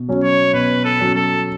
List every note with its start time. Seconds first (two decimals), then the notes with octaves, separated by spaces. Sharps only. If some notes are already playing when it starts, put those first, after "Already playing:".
Already playing: B2
0.09 F#3 C#4
0.23 C#5
0.53 B2 B4
0.85 A4
1.00 F#3 C#4
1.15 A4